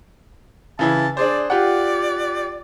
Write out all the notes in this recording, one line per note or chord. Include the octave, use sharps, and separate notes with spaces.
C#3 E3 E4 A5
D4 G#4 C5 D5
F4 G4 D5 F#5